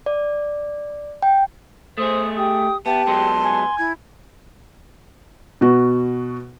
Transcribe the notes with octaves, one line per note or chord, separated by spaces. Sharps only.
D5
G5
A3 G#4 C5 D#6
G4 D#6
B3 G4 E5 A5
F#3 G#3 B3 C6
G#5
E4 G#6
B2 F#4